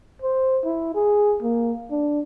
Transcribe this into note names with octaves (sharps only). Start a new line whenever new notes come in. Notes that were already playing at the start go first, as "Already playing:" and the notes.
C5
E4
G#4
A#3
D4